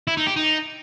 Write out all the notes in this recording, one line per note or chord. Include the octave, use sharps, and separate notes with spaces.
E4
D#4
G4
D#4